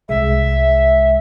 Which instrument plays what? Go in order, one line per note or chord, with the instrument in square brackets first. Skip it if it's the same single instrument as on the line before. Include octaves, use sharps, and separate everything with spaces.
[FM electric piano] C2 G#3 [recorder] E5